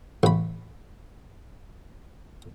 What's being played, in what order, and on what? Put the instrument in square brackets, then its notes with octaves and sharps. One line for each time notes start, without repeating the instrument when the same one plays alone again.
[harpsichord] A1 B5